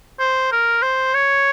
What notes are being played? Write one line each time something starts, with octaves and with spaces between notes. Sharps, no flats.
C5
A#4
C5
C#5